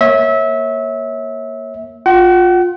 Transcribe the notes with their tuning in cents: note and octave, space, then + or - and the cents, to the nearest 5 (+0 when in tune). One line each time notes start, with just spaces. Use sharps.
A#3 +0 C#5 -20 E5 -25
F4 +20 F#5 +40